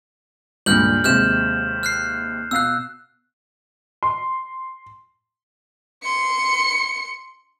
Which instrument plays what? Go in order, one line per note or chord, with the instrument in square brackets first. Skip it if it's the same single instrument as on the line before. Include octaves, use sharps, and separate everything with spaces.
[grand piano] C#2 G2 A#2 [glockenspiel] F6 G6 F#7
[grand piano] D#2 C3 G#3 [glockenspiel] F6 G6 E7
[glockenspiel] F6 F#6 C7
[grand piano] B2 F5 C7 [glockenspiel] E6 F#6
[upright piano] C6
[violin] C6 C#7